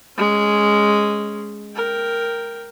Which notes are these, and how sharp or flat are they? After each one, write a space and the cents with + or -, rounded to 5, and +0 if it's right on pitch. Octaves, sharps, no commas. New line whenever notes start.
G#3 +0 C#4 +0
A#4 +0 G5 +0